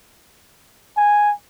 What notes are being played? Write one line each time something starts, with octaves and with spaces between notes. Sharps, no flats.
G#5